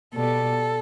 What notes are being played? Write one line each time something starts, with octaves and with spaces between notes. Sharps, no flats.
B2 G3 A4